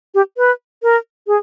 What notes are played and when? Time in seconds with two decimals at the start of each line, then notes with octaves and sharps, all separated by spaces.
0.14 G4
0.37 B4
0.83 A#4
1.27 G#4